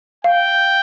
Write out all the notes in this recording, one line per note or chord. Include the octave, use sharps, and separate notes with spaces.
F5 G5